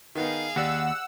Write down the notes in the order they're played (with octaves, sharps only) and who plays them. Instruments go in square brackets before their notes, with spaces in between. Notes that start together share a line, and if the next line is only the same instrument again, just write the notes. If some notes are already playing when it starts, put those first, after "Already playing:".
[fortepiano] D#3 B3 D#4 [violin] G#4 F5
[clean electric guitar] D#2 [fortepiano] G4 D5 [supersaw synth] F#5 E6